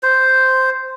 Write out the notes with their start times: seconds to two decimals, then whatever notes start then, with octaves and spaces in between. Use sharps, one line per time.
0.03 C5